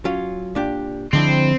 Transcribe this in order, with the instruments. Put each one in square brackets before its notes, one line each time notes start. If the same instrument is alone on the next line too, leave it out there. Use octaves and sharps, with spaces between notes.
[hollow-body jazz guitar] F#3 C#4 F4
A#2 D4 G4
[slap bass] D3 F3 [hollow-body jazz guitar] G#3 D4 E4 [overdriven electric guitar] C4